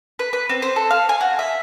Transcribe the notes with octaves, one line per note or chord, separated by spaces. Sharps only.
B4
B4
C4
C5
A4
F5
G#5
F#4
E5